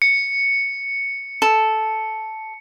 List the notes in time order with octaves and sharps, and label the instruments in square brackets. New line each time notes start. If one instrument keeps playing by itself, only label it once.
[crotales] C#7
[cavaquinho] A4